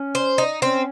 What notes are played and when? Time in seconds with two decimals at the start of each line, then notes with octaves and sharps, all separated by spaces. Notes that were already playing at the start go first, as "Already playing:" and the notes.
Already playing: C#4
0.15 C5
0.38 D#4
0.62 C4 C#4